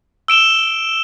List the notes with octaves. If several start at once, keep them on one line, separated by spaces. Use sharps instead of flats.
E6 D7 E7 G7